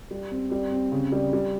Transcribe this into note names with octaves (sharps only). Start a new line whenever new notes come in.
G3
C4
G3
C4
C#3
G3
G3